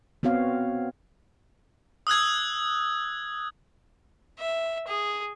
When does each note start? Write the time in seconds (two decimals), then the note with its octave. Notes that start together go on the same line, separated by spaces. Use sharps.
0.23 B3 C4 F#4 C#5 F5
2.07 D#6 E6 F#6 G#6
4.39 E5
4.87 G#4